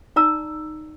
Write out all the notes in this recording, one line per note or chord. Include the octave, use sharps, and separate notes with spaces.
D#4 D5 A#5 E6